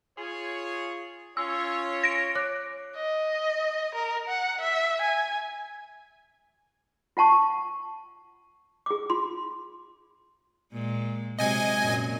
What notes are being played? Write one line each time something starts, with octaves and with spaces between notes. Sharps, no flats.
F4 G#4 C#5
C#4 F4 C#5 E6
A#6 D7
C#5 D6 F#6
D#5
A#4
F#5
E5
G#5
F4 F#5 A5 C#6
G#4 D6
F4 C6
A#2 G#3
C3 F#3 G#3 D#5 G#5 G#6
F#2 A#2